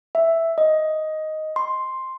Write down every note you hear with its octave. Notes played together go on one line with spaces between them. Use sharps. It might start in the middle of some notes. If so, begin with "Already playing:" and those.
E5
D#5
C6